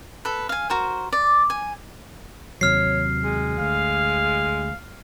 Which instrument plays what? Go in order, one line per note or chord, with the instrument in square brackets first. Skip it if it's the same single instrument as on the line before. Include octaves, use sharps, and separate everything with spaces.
[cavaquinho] A4 B4
F5 G#5
F#4 A#4 C5
D5
G#5
[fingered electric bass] D#2 C3 F#3 [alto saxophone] C#5 [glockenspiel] F6 C7
[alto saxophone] G#3
[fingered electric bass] D2 [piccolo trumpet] F5